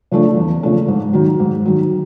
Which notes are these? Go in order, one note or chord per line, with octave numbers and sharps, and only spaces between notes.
C#3 F3 A3 D4
E2
C#3 F3 A3 D4
G#2
D#3 F#3
G#2
D#3 F#3